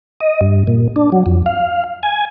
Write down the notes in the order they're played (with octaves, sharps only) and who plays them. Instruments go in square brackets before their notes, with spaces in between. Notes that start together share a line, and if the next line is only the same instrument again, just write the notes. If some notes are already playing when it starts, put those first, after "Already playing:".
[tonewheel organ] D#5
G2
A#2
D4
F#3
F2
F5
G#5